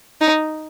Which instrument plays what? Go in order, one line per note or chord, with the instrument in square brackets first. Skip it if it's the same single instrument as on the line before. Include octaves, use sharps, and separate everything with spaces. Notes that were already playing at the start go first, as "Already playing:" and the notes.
[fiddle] D#4